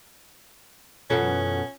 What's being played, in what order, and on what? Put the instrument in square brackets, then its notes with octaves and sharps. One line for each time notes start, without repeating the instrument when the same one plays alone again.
[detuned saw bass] F#2 [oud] B2 E3 A4 [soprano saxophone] C#4 [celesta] F4 F#5